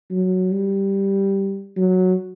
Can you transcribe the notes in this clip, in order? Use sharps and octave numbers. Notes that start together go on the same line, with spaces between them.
F#3
G3
F#3